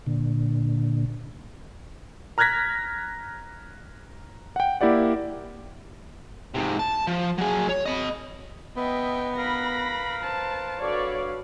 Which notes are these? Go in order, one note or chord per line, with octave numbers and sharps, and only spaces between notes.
A#2 D3
A#5 F6 F#6 G#6 A#6 B6
F#5 G5
A#3 E4 G4 D5 F#5
G#2 C3
A5
F3
F#3 G#4
C#5
D#5 B5
B3 D#5 E5 G5
A#4 B4 F5 B5 A#6
C5 A5
G2 F#4 A4 B4 C#5 D5 F5